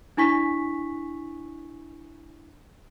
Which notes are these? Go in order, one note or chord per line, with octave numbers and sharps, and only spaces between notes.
D4 E4 G#5 C#6 B6